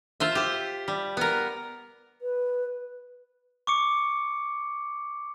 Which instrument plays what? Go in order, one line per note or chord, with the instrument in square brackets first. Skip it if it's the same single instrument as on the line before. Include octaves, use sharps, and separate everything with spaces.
[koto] F4 C5 E5
G4 C5
G3
B3 A#4
[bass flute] B4
[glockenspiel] C#6 D6 C#7